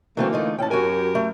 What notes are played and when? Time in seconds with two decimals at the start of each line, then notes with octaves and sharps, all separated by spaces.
0.17 D3 E3 F#3 A3 A#3 C4
0.33 A3 D#4 F4
0.59 A2 C#4 G5 A5
0.71 F#2 F#4 G4 A#4 G#5
1.15 A3